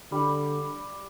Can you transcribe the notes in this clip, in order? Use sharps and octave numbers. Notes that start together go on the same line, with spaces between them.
D3 G3